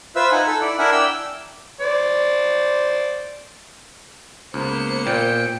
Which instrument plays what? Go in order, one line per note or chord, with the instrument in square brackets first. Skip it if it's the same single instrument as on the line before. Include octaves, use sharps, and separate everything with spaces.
[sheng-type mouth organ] F4 B4 C5 E5 E6
D#4 F#5 G#5
A4 E6
E4 D5
D4 E4 A#4 E5 F#5 G#5
D5 G5 E6
[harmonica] C5 D5
[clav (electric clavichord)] C#2 [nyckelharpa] A#3 B3 [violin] C5 C#7
[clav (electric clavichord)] A#2 [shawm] G5